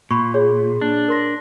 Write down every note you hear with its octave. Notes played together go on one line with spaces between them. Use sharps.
A#2 B5 C#6
G#4 C#5
D4
A#4 C6 A#6